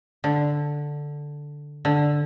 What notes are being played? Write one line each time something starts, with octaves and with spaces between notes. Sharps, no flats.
D3
D3